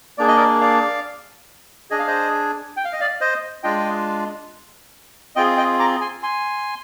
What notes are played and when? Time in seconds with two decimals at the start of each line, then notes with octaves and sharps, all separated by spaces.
0.18 A#3 D4 G#4 D5
0.28 D#5
0.37 A#4 D5
0.61 D5 F5
1.91 D4 G#4 D#5
1.99 F5
2.07 C5 D#5
2.77 G5
2.85 F5
2.93 D#5
3.00 D5 F5
3.21 C5 D#5
3.63 G#3 D4 F4 D#5 G5
5.36 C4 F4 G#4 D#5 G5
5.57 D#5 G5
5.79 A#5 D6
6.01 G#5 C6
6.23 G#5 C6